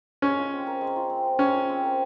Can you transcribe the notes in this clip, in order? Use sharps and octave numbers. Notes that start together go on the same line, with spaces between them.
G#3 C#4
F4
C4
A#4
G#3
F4
C4
A#4
G#3 C#4
F4
C4
A#4